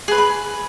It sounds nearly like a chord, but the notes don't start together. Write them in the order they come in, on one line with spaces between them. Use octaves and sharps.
G#4 B4 C6 B5